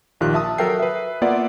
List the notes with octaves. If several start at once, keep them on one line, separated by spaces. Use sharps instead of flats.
A#1 D#3 F4 G4 F#6
E5 A5 D#6
F#3 A4 A#4 E5 G5 C7
B4 E5
A#3 B3 F4 D5 E5 F#5